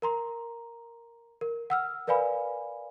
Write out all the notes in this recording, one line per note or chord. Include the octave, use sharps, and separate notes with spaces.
A#4 A#5 C6
A#4
F#5 E6 F6
A#4 B4 D5 F5 G#5 B5